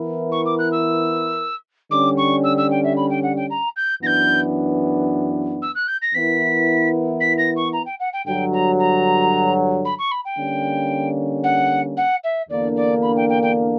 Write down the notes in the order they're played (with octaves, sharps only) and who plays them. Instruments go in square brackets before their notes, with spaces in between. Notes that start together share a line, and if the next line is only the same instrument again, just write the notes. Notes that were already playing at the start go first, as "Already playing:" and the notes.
Already playing: [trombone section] E3 B3 E4 A#4
[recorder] C#6
D6
F#6
E6
[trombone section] D3 G3 C#4 [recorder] D6
[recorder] C#6
E6
E6
G5
E5
B5
G5
F#5
G5
A#5
G6
[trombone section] F#2 E3 B3 D4 [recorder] G6 A#6
[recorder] E6
F#6
G6
A#6
[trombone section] E3 B3 E4 A#4 [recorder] B6
[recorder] B6
A#6
C#6
A#5
G5
F#5
G5
[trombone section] G2 D3 F#3 [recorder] G5
[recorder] A#5
A#5
B5
C#6
B5
G5
[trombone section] D3 G3 A#3 C#4
[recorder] F#5
F#5
E5
[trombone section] E2 D3 A#3 D4 [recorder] D5
[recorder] D5
B5
G5
G5
G5